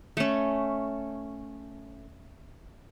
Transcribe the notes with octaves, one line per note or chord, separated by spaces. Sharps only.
A3 C#4